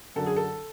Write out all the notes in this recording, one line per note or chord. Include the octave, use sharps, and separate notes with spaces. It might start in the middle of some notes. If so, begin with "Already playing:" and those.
F#2 D3 F#3 A4
G#4
A4